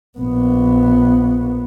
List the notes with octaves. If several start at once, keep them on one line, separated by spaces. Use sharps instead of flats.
A#1 B3